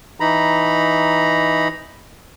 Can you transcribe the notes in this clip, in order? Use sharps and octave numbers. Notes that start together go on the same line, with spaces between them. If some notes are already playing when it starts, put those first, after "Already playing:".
E3 D#4 A#5 B5